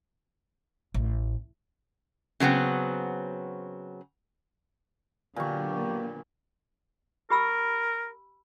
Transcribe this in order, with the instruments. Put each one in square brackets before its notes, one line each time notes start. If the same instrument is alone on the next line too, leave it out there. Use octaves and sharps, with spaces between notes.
[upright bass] A1
[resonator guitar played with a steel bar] C#3 F#3 B3 C4
[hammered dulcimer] A#2 C#6 [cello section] D3 F#3 B3 [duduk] G4
[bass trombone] A#3
[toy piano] G4 B5 E6 [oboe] A#4